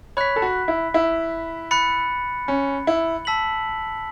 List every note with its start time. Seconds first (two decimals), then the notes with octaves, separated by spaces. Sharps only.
0.17 C#5 B5 F#6 B6
0.36 A4
0.42 F#4
0.68 E4
0.94 E4
1.71 B5 F#6 A6 C#7
2.48 C#4
2.87 E4
3.25 A5 E6 B6 F#7